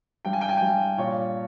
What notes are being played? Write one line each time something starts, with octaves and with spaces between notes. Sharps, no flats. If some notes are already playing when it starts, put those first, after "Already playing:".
G2 G5
G#5
G5
G#5
G2 G5
A#2 C#5